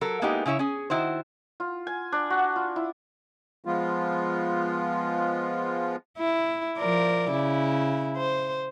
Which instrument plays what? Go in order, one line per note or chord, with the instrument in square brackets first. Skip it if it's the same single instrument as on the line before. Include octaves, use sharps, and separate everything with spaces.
[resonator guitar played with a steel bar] F#3 A4 A#4
G#3 A#3 B3 D#4 E4 G4
C#3 C#4 E4 C#5 E5
C#4 G#4
D#3 E4 F#4 C5
[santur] F4
G#5
D4
F#4
F4
E4
[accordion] F3 G#3 B3 F4
[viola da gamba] E4
F3 A#4 D5
C#3 E4
C5